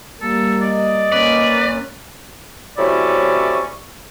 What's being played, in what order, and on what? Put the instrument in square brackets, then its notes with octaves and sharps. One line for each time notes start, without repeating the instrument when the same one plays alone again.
[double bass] G3 A#3 [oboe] A4
[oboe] D5 [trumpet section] D#5
[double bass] A#3 C#4 [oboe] B4 [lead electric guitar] D5
[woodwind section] A2 C3 F#3 C#4 E4 D5